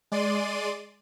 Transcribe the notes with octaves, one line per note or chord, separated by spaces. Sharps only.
G#3 D5 C6 D#7